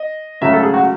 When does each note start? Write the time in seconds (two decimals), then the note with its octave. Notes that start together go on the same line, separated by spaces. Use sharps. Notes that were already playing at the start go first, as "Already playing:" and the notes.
Already playing: D#5
0.41 C#2 C#3 F#3 A3 E5
0.53 A4
0.63 G#4
0.74 F#4